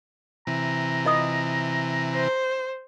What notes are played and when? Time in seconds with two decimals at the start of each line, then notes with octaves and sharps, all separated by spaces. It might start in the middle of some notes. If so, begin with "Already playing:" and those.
0.47 C3 E3 A#5
1.05 F4 D#5 D#6
2.14 C5